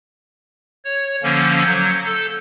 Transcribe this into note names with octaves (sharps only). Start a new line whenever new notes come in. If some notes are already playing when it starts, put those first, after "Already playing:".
C#5
D3 F3 A#3 C#4
F#3 G6 G#6
A4 E6 G6